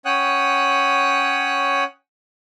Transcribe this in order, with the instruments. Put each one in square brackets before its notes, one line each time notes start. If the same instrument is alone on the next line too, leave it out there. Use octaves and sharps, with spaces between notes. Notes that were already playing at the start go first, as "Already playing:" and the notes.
[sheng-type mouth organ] C#4 C#5 F#5 G5 D#6 F#6